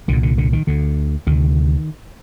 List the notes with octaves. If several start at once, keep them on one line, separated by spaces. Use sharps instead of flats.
C2 A#2 D3
D3
D3
D#3
D2 D3
D2 C3 D#3